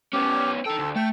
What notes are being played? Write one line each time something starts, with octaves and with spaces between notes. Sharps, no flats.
B3 C#4 G4
D#4 A4 G5
D2
A3 G5